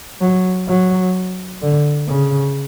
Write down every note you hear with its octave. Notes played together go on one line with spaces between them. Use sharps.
F#3
F#3
D3
C#3